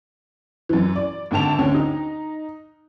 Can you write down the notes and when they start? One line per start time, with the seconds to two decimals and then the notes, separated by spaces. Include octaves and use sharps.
0.69 F#2 E3
0.96 D5
1.31 G#1 D3 G5 A5 F7
1.58 D2 D3 C#4 G5
1.74 D#4